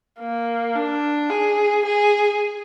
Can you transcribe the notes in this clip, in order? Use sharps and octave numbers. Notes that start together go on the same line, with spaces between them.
A#3
D4
G#4
G#4